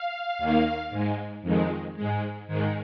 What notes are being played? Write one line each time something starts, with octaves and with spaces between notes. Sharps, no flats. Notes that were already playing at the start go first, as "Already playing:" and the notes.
Already playing: F5
D#2 D#3 A#3
G#2 G#3
F2 D#3 G#3
G#2 G#3
G#2 D#3 G#3